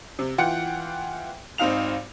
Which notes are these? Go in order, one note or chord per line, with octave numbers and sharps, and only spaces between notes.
C3
E3 F4 F#5 G5 C#7
G#1 C4 D#4 F5 F7